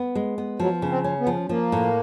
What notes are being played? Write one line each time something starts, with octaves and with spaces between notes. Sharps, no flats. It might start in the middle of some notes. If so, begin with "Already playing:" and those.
Already playing: B3
G#3
B3
F3 F#3
C#3
C4
C#4
B3
F3
F3 A#3
A2